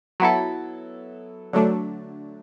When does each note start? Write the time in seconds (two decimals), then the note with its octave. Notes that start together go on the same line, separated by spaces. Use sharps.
0.20 F#3 B3 E4 A4
1.53 D3 F#3 A3 D4